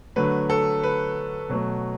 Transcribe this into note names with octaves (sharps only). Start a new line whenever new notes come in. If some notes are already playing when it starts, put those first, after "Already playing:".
D3 F#3 A3 B4
A4
B4
B2 F#3 A3